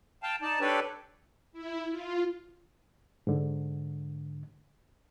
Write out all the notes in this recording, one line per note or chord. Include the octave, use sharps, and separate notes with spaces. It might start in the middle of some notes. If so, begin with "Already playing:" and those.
F5 G5 A5
D#4 D5 A5
D4 G4 A4 B4 C#5 D5
E4
F4
G#2 D3